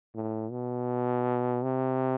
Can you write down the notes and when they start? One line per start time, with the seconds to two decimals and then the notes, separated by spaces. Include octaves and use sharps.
0.15 A2
0.51 B2
1.64 C3